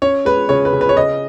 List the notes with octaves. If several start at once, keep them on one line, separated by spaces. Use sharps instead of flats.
C#4 C#5
G#3 B4
C#3 C#5
B4
C#3
B4
C#5
C#3 D#5